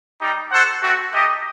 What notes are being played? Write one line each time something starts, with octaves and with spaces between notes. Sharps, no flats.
G3 D#4 G4
F#4 A4 C5 F#5
A3 C4 F#4
A3 D#4 G4 D#5